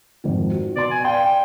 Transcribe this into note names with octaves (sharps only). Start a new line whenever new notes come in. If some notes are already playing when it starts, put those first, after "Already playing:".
G#1 F2 D#3
F#4
B2 D5 C6
G#5
D5 F5 G5 C6